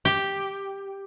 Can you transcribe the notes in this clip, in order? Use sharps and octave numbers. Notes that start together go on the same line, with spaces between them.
G4